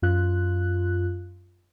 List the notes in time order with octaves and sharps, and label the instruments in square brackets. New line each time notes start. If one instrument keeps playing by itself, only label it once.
[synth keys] F#2 F4 F#6